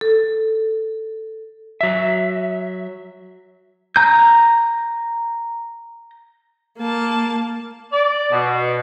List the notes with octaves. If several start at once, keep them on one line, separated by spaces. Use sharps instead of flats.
A4
F#3 E5
A#5 G6
A#3 A5
D5
B2